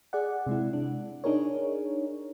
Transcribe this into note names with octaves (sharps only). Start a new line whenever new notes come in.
G#4 D5 F#5
C3 G#3 E4
D4
D4 D#4 G#4 A#4 C#5